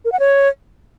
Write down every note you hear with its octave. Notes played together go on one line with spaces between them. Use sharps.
A#4
F#5
C#5